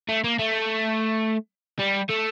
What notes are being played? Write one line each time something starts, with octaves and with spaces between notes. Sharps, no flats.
A3
A#3
A3
G3
A3